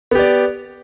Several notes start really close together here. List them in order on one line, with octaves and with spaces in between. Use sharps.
B3 G4 D5